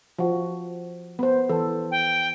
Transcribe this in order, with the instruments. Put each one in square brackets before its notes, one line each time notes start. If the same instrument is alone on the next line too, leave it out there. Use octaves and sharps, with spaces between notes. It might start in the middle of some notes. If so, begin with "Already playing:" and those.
[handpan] F3 F#4
B3 C5
E3 A4
[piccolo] G5